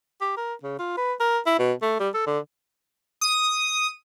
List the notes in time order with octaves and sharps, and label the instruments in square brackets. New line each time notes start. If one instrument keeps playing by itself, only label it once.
[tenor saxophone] G4
A#4
C#3
F4
B4
A#4
E4
B2
A3
G3
A4
D3
[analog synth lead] D#6